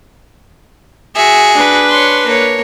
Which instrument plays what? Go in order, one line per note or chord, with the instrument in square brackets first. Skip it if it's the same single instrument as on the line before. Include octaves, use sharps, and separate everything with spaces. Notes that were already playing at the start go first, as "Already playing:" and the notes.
[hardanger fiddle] F#4 G#4 [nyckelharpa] E5
[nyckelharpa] D4 B4
[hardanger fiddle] C#5 C6
A#3 C#5